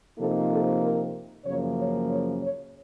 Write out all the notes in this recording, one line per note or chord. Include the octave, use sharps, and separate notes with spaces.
C3 F3 A#3 D#4 A4
A4
A#4
F#2 C#3 F3 A#3 C#5
C#5
C#5
C#5